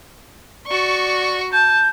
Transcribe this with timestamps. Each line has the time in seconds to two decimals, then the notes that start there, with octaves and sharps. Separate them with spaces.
0.67 F#4 D5 C#6
1.53 A5 G6